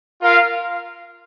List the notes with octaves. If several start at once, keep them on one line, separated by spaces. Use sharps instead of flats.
F4 A#4 F5